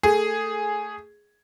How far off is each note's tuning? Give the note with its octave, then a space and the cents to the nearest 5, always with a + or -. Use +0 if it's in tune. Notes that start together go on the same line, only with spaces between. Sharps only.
A3 +20 G#4 +0